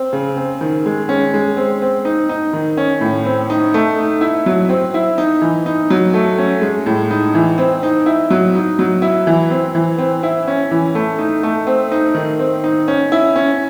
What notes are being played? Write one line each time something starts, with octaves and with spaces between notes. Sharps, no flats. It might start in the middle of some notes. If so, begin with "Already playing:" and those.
Already playing: C4
C#3
C4
D#3
G#3
C#4
G#3
C4
C4
D#4
D#4
D#3
C#4
A2
C4
D#4
A3
D#4
E4
F#3
C4
E4
D#4
E3
D#4
F#3
A3
C#4
G#3
A2
D#4
E3
C4
D#4
E4
F#3
D#4
F#3
E4
E3
C4
E3
C4
E4
C#4
E3
A3
D#4
A3
C4
D#4
D#3
C4
D#4
C#4
E4
C#4